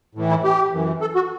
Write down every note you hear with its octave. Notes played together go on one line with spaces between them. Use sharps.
A2 E3
E4
G4
F#2 E3
A4
F#4